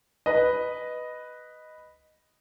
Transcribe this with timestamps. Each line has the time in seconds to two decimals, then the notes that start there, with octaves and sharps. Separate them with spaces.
0.26 B4 D#5